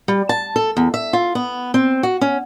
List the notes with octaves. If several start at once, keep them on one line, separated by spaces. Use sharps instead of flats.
G3
A5
A4
E2
E5
F4
B3
C4
F#4
C#4